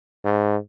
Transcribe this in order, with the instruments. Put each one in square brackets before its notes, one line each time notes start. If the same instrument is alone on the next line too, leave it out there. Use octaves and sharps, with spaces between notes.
[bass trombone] G#2